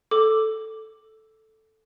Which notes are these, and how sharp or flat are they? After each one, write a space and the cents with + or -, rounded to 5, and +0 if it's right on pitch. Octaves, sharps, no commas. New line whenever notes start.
A4 +0 D6 +0